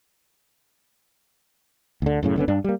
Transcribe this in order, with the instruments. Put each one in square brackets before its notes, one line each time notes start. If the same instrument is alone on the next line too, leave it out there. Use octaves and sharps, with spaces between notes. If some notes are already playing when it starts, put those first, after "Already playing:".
[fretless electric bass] D2 D3
F#2 A2 C#3
F#1 D3 B3 C#4
G2 D4
G3 A#3